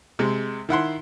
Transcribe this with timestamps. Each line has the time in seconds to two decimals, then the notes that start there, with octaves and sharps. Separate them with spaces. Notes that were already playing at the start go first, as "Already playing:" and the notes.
0.19 C3 G#3
0.69 D#3 E4 F#5 C6